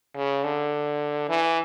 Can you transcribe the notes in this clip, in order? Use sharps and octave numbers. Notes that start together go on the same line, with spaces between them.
C#3
D3
E3